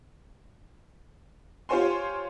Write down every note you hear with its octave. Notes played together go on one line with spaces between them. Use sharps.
F4 G4 C5 C#5 G#5 C6